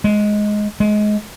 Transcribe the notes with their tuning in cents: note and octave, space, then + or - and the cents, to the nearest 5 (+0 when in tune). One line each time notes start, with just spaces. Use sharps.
G#3 +10
G#3 +20